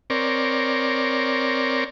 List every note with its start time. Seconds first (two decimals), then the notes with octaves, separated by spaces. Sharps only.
0.10 C4 A#4 C#5 D5